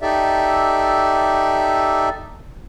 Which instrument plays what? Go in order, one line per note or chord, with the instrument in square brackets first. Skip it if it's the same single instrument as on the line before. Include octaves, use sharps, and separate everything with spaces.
[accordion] D#4 G4 A4 D5 E5